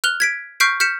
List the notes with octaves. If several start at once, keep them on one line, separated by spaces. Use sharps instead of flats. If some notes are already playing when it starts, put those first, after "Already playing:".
F6 F#6 F7 G7
G#6 B6 D7
C#6 F6 G6 B6 C7 D7
F6 G6 B6 C#7 E7